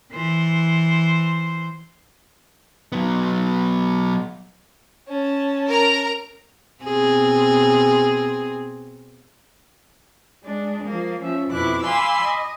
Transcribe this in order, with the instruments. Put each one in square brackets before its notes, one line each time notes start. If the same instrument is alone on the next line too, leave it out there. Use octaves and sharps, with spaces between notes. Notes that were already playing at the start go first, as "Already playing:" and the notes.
[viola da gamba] E3 C5
[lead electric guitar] F#3 B3
[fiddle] C#4 A5
[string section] A#4 A#5
[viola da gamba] B2 C4 G#4
[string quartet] G#3 D4
F3 A#3
F3 C#4 E5
F2 B2 E4 D6 F#6
F5 G#5 B5 C6 D6 E6
D#5